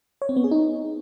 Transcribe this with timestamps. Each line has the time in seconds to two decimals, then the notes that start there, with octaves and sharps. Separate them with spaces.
0.22 C#5
0.29 C4
0.36 B3
0.44 G#4
0.51 D#4